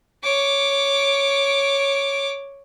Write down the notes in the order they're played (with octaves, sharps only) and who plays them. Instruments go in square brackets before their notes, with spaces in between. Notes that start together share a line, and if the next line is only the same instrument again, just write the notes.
[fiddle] C#5 D6